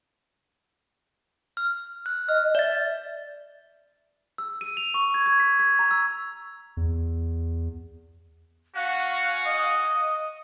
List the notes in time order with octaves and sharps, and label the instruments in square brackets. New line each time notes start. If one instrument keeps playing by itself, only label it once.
[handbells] F6
F#6
[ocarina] D#5 [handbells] F6
[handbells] D5 A6 [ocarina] E5
[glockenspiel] E6
D#7
F7
C#6
G#6
G#6
B6
G#6
A#5
E6
[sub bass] E2
[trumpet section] C#4 F#4 [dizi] F5 [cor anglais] F#5
[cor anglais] D#5